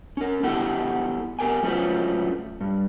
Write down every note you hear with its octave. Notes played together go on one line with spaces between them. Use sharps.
C#4 A#4
B3 E4 G4 A4 F#5
B3 G4 A#4 G5 G#5
F#3 A3 C#4 F4 B4 C5
G2